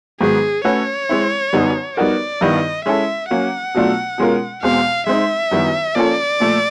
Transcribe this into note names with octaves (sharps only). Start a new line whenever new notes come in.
G#2 D#3 F#3 B3 G#4
A3 C#4 F#4 B4 C#5
G#3 C4 E4
F#2 D3 G3 B3 D#4
G3 B3 D#4 F#4 A#4 D5
G2 D#3 G3 B3 E4 D#5
G#3 C#4 E4 A4 E5
F#3 A#3 C#4 F#5
B2 F#3 A3 D4 F4
B2 G#3 C#4 F4 A#4
E2 B2 G#3 C4 F5
G#3 C4 D#4 E5
F#2 D#3 G3 B3 E4
F3 A#3 C#4 F4 A4 D5
A#2 F3 A3